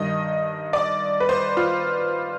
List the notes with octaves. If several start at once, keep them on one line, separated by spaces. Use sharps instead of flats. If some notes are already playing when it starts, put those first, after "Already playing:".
Already playing: G2 D#3 D#5
D5
B4
C5
F4